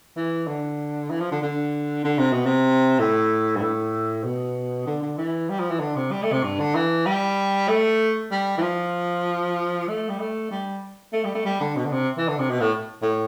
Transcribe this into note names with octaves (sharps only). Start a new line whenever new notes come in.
E3
D3
E3
F3
D3
D3
D3
C3
B2
C3
A2
G2
A2
B2
D3
D3
E3
G3
F3
E3
D3
C3
G3
A3
C3
G2
D3
E3
G3
A3
G3
E3
F3
A3
G3
A3
G3
A3
G3
A3
G3
D3
B2
D3
C3
E3
D3
C3
B2
A2
A2